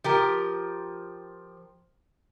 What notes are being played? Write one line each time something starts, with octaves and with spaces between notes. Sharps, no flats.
F3 G4 A#4